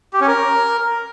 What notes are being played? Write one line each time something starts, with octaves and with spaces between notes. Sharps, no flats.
G4
C#4
A#4